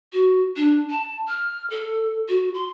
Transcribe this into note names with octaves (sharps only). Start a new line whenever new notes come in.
F#4
D4
A5
F6
A4
F#4
C6